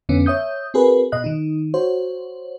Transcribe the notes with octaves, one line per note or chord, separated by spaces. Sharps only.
F2 D3 B3 C#4
C#5 E5 D#6 G6
C4 F#4 G#4 A#4 B4
B2 D#5 F#6
D#3 D#4
F#4 C5 C#5